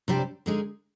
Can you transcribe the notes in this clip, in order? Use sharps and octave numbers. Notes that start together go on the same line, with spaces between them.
C3 G3 D4 G4 C5
D3 G#3 D#4 G#4